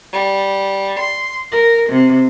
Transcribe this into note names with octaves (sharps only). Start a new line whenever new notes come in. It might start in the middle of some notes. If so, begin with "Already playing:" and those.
G3
C6
A#4
C3